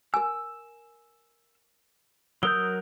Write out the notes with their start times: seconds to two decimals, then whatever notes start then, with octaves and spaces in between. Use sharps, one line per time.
0.14 A#4 G#5 E6
2.43 F#3 A#4 D#6 E6 G6 G7